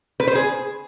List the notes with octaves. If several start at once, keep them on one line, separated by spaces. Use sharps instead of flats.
B4
C5
G#4